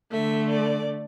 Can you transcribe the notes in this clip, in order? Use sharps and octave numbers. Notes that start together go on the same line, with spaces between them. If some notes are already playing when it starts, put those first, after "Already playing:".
D3 A3 E5
D5